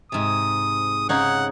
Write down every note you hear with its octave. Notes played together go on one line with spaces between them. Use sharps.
G#2 C3 D#6
C#3 D#4 C#5 F#5